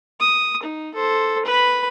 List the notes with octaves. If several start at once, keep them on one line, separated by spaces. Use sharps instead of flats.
D#6
D#4
A4 C5
B4 B5